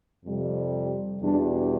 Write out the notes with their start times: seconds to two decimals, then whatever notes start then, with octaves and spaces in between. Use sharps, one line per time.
0.25 F2 C3 G3
1.21 E2 B2 G3 D4